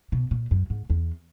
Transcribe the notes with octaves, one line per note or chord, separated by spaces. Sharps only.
B2
A#2
F#2
G#2
E2